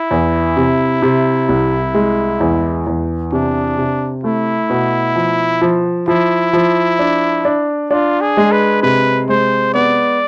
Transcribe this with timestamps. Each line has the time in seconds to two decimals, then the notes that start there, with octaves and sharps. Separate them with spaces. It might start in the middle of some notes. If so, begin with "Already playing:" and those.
Already playing: E4
0.11 E2
0.57 C3
1.02 C3
1.49 C2
1.94 G#3
2.40 E2
2.87 E2
3.32 C3 D4
3.78 C3
4.24 A3 E4
4.70 B2
5.16 F3
5.61 F3
6.08 F3 E4
6.53 F3
6.99 D4
7.45 D4
7.91 D4 F4
8.21 G#4
8.37 G#3
8.52 B4
8.82 C3 B4
9.29 G#3 C5
9.74 B3 D5